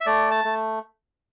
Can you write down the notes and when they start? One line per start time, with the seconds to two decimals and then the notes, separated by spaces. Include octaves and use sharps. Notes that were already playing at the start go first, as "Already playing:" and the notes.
0.01 E5
0.06 A3 D5
0.31 A5
0.45 A3